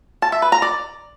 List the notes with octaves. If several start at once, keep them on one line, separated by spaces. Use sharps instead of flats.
A5
E5
B4
A#5
D5